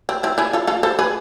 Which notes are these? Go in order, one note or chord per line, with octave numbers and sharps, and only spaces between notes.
C4
C4 E4
E4 G#4
F4 A4
F4 A4
A4 C5
G#4 B4